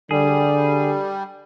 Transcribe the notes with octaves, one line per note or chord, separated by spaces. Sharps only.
D3 G3 G#4